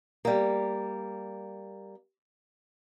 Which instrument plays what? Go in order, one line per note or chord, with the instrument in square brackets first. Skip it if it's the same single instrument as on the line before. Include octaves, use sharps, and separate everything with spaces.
[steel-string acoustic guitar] G3 A#3